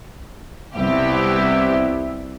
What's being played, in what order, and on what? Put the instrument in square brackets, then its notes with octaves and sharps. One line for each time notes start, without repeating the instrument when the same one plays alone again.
[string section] C2 G4 [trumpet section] B3 E4 E5